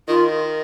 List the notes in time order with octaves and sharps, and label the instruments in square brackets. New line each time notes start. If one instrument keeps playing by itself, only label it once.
[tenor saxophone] D#3 [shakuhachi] F4